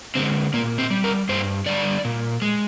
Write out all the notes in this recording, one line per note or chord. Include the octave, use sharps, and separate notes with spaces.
D3 G#3 C4
A#2 A#3
C4
G3
A#4
G2 C5
D3 G3 D5
A#2
G#3